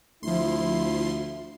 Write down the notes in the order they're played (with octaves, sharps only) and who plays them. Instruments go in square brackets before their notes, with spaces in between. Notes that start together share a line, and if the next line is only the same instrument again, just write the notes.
[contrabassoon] D2 [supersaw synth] F3 C6 [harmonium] E4